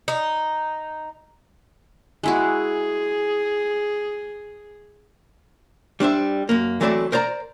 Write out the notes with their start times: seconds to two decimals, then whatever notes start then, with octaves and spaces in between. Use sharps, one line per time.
0.08 D#4
2.23 G#3 E4 F#4 G#4
6.00 G3 D4 C5 E5
6.49 F#2 A#3
6.81 E3 F#3 A3 C4 D5 E5
7.12 A#4 C5 D5 A#5